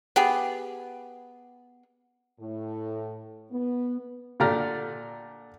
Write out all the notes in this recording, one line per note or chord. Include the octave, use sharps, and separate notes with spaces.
B3 G4 G#4
A2
B3
A#2 D3 G4 D5 A#5 F6